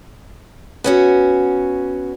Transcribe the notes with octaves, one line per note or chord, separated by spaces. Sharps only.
B3 C#4 F#4